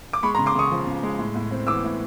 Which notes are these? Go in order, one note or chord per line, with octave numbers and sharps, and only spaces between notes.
D6
G#3 B5 C#6
A#5 C6
C#3
C6 D6
C#3 C#6 D#6
F3
C#3
G#3
A2
A2
C4
E3 D6 E6
A2